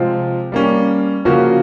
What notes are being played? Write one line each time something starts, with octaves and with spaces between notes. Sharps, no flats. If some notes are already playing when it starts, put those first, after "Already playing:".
Already playing: C3 F3 G#3 C4 F4
G3 A#3 C#4
C#3 F3 A#3 C#4 F#4